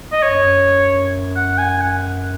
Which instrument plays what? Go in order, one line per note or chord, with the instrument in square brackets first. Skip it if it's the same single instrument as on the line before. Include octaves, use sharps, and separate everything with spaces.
[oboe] D#5
[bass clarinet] F#2 [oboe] C#5
[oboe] F#5
G#5
F#5